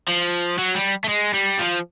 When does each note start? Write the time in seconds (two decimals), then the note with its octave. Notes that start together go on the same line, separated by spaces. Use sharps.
0.08 F3
0.58 F#3
0.75 G3
1.04 A3
1.09 G#3
1.34 G3
1.59 F3